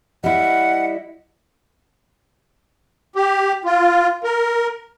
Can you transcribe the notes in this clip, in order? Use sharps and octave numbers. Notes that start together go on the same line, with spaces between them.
G3 E4 D#5 F#5
G4
F4
A#4